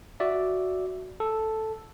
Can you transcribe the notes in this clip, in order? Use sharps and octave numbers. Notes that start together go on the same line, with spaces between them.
F#4 D5 E5
A4